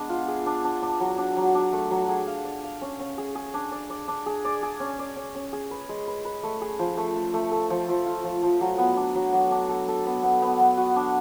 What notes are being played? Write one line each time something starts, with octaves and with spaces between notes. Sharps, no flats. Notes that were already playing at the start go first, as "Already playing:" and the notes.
Already playing: G#3 B3 D4
F4
G#4
D4
D4
D4
F#3
D4
F#3
D4
A3
F#3
G#4
F5
D5
F5
C#4
C#4
G#4
G#4
D4
D5
D5
D4
G#4
D5
G#4
C#4
D5
C#4
C#4
G#4
B4
G#3
B4
B4
A3
G#4
F3
A3
A3
A3
A4
F3
F3
F4
F3
F3
F#3
B3
D4
F#3
F#3
D4
A4
A4
B3
B3
B3
B3
F#4
D4